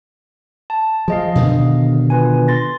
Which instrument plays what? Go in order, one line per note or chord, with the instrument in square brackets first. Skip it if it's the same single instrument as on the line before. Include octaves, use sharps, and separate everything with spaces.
[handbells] A5
[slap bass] F3 [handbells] G#4 D#5 F5
[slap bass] B2 D3 D#3
[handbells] F4 B4 G#5
C6 A6 A#6